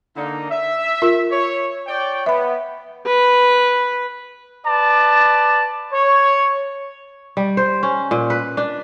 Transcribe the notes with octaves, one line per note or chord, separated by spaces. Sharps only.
D3 A#3 D#4
E5
F4 A#4
C#5
C#5 D5 G5
B3 E5 B5
B4
B4 D5 A5
C#5
G3
C5
C#4
A#2
B4
D4